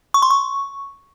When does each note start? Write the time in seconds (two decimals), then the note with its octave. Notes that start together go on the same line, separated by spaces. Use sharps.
0.14 C#6
0.22 C6
0.30 C#6